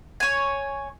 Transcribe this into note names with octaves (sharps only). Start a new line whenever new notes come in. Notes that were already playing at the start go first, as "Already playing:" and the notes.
C#5 G#5